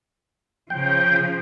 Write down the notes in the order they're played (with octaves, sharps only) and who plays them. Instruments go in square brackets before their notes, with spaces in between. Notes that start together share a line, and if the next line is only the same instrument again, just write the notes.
[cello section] C#3 F3 [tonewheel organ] G5